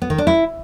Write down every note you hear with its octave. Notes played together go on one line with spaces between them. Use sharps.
B3
D#3
D4
E4